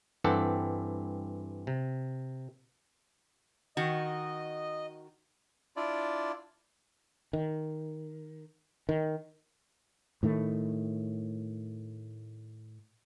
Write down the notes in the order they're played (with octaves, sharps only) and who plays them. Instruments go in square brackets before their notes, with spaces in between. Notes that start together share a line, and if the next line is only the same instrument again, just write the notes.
[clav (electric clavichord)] G2 E3 C4 G4 A4 F#5
C3
[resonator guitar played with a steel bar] D#3 F#4 [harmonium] D#5
[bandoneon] D4 E4 F4 D5
[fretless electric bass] D#3
D#3
A2 D#3 A3